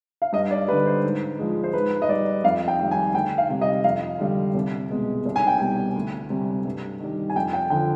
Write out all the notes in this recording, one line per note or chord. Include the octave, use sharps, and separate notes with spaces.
F5
G2 D#5
D5
D3 G3 B4
C5
G#2
F3 G#3
C5
G#2 B4
D#5
G3 D5
F2 F5
G5
D#3 G3
G#5
D2 G5
F5
C3 G3
D#5
F2 F5
D3 G3
C2
B2 G#3
C2
G#5
G5
B2 G3 G#5
D2
C3 G3
G2
D#3 G3
G#5
F2 G5
G5
D3 F3 G5